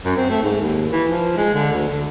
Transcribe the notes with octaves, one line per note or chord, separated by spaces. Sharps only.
F#2
C4
A3
G#2
D#2
E3
F3
G#3
D3
D2
D3